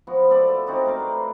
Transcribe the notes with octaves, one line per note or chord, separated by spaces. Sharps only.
F3 B3 F#4
B3 A4 D5
E5
C4 D#4 F#4 D5
A3 A#4 F5 C6
B4